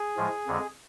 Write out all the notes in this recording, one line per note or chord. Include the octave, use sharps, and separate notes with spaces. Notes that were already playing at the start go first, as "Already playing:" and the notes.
Already playing: G#4
A2 F3 G#3
F2 D3 G#3